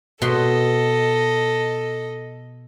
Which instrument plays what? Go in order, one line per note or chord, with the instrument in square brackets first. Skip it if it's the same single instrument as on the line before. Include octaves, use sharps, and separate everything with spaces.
[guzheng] B2 C6 [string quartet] A4 D#5